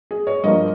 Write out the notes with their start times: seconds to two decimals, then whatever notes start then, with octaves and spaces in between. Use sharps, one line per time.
0.11 G#4
0.27 C#5
0.44 G2 F3 A#3 D#5